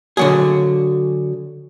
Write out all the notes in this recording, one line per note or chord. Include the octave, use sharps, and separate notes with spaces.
D3 F#3 G#4